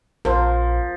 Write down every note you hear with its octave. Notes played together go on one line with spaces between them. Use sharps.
A#1 F3 A#4 C5